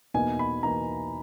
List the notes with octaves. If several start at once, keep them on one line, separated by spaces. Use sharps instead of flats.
E2 B2 A#3 D#4 G#5
B5
E2 B2 A#3 D#4 A#5